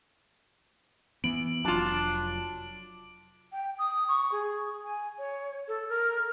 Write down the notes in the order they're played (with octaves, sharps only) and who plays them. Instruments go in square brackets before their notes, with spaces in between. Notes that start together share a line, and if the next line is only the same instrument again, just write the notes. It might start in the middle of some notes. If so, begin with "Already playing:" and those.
[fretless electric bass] E3 B3 [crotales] D7 F#7
[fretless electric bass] F1 F#3 [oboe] D4 [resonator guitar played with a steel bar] F4 A5
[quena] G5
D#6
C#6
G#4
G#5
C#5
A4
A#4